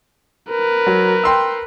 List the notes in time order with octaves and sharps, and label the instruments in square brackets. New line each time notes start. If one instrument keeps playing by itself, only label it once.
[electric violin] A#4 B4
[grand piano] F#3
G5 C6 E6